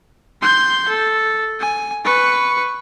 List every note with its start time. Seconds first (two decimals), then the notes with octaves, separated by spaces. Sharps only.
0.42 C6 G6
0.89 A4
1.60 G#5
2.05 B4 C#6